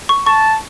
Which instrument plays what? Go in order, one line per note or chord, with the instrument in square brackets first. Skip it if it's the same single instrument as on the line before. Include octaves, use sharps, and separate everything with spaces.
[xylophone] C#6
[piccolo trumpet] A5 [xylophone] C#6